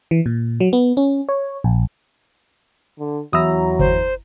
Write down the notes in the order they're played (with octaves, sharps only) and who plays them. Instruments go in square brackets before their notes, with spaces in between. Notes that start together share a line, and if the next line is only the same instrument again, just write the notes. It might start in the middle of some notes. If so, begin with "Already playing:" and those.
[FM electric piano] E3
A#2
F#3
B3
C#4
C#5
A#1
[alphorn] D3
[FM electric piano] E2 E4 A#5 [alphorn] F#3 [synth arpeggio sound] D#6 E6
[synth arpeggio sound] G1 [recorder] C5